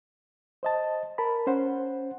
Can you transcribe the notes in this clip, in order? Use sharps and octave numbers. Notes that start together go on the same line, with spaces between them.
C5 D#5 A5
A#4 A5 B5
C#4 C5 F#5